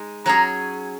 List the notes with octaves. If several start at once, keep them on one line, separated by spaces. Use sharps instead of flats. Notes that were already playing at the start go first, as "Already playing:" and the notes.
Already playing: G#3 D#4
F#3 C#4 G#4 A#5